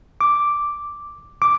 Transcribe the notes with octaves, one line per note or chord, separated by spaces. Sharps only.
D6
D6